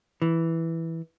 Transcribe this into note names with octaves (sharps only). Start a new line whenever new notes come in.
E3